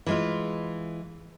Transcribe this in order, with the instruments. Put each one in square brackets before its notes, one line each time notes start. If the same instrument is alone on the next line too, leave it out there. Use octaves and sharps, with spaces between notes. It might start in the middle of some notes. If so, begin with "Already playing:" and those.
[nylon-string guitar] E3 G#3 F4